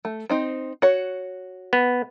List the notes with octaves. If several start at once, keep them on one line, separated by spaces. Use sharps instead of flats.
A3
C4 D#4 C5
F#4 C#5
B3